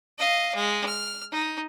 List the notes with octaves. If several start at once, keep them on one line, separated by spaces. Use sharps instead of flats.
D#5 F5
G#3
F6
D#4